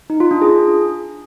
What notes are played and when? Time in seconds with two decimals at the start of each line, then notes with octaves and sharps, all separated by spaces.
0.10 D#4
0.20 F4
0.31 D4
0.42 G#4